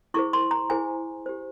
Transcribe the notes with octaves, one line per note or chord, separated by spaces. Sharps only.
E4 G#4 C5 C#6
C6
A#5
E4 G#4 C5 G#5
G4 C5